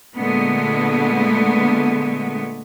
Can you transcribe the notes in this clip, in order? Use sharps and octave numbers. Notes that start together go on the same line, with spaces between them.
A#2 D3 G#3 A3 B3